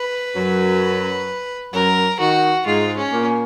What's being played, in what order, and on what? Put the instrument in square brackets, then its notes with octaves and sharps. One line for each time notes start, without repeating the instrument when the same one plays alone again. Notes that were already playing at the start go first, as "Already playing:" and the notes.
Already playing: [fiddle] B4
[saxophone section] F#2 F#3
[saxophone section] F#2 F#3 [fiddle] A#4
[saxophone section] D#3 [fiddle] F#4
[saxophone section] G#2 G#3 [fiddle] F4
[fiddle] C#4
[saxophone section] A#2 A#3